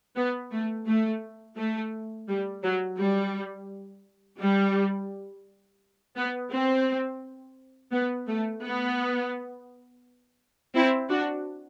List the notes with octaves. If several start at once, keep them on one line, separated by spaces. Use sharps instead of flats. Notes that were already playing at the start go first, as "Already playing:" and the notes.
B3
A3
A3
A3
G3
F#3
G3
G3
B3
C4
B3
A3
B3
C4 E4
D4 F#4